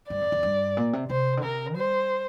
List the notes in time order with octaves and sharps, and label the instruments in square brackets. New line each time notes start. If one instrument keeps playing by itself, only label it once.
[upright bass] G2 [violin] D5
[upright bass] F2
F2
G2
A#2
C3
[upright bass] C3 [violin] C5
[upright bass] D3
[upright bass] C3 [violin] A#4
[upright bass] G3 [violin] C5